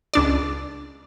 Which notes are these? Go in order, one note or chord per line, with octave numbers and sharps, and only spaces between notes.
C#2 D4 D5